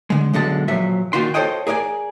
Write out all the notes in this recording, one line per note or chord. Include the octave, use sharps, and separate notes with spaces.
D3 G#3
B1 D3 G#3 A5
A#2 F3 F#3 E5
A#2 D#3 F4 F#4 C6
F4 A4 C5 C#5 D#5 G5
G#4 A#4 D5 F5 G#5